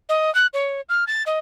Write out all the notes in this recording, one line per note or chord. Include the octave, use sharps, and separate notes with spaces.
D#5
F#6
C#5
F6
A6
D#5